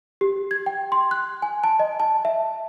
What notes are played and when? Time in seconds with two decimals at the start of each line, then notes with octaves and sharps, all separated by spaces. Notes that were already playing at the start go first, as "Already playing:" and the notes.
0.21 G4
0.51 G#6
0.66 G5
0.92 C6
1.11 F#6
1.42 G#5
1.64 A5
1.80 D#5
2.00 A5
2.25 E5